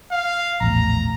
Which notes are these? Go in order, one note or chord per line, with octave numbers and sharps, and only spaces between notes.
F5
A#1 E2 A2 A#5